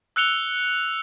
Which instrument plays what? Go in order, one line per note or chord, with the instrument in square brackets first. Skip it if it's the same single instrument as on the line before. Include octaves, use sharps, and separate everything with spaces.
[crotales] E6 F#6 C#7 F7 G7